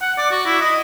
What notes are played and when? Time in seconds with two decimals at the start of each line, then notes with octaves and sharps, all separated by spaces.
0.02 F#5
0.18 D5
0.31 F#4
0.46 E4
0.62 D#5